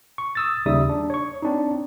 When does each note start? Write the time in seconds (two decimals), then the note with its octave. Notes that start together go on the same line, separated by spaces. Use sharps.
0.18 C#6
0.35 D#6 E6 A6
0.66 D#2 C#3 G3 D#4 E5 D#6
0.89 D4
1.10 C#5 C#6
1.42 C4 D4 D#4